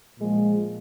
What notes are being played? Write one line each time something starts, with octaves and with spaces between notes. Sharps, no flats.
A#2 F3 G#3